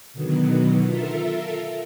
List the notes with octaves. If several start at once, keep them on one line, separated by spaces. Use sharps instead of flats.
B2 D3 D#3 F#3 B3
F4 A4 A#4 E5